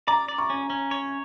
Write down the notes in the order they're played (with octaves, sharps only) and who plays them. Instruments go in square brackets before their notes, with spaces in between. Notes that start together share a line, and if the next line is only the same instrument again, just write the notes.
[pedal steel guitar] D5 [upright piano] A#5
[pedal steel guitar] D5
[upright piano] C#6
[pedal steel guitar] C#4
C#4
C#5